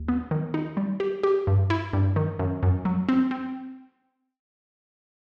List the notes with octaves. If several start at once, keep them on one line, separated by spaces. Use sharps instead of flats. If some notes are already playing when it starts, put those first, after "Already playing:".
Already playing: D#2
B3
D#3
D#4
G3
G4
G4
G2
E4
G2
D#3
F#2
F#2
F#3
C4
C4